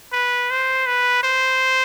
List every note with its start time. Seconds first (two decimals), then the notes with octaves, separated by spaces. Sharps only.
0.13 B4
0.51 C5
0.86 B4
1.23 C5